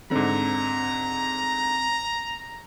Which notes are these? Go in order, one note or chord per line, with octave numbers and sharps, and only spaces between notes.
G#2 D3 C4 A#5